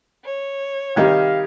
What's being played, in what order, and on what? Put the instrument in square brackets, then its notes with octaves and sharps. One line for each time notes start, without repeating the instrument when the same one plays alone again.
[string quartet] C#5
[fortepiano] C3 D#3 G3 [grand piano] G4 D#5 G#6 [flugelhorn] F5